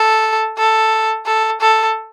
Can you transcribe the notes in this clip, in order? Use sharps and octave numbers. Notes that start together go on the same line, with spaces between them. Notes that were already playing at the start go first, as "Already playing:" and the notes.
Already playing: A4
A4
A4
A4